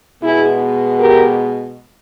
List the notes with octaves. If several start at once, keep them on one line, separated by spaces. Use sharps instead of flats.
B2 G#3 B3 E4 G#4
G4 A#4